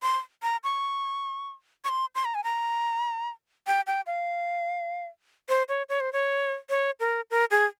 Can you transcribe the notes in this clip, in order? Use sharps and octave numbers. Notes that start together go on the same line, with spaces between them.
C6
A#5
C#6
C#6
C6
C6
A#5
G#5
A#5
G5
G5
F5
C5
C#5
C#5
C5
C#5
C#5
A#4
A#4
G#4